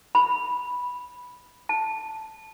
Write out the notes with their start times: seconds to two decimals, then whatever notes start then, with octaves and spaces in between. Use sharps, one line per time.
0.15 B5
1.69 A5